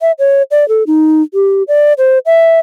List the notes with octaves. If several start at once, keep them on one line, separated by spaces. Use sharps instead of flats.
E5
C#5
D5
A4
D#4
G4
D5
C5
E5